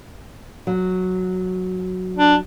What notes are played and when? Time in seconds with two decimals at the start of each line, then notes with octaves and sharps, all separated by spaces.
0.67 F#3
2.16 D4